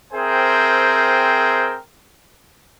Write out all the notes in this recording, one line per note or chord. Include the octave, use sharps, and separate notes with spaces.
C4 G#4 A#4 C5 E5 G5